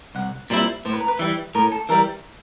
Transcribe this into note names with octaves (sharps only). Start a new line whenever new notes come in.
C2 F#5
A#2 G3 C4 E4
A2 C5
B4
A#4
B4
E3 G3
A2 A#4
A4
E3 G3 A#4